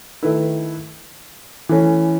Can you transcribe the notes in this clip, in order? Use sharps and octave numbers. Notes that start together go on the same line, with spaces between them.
D#3 A3 E4 B4
E3 A3 C#4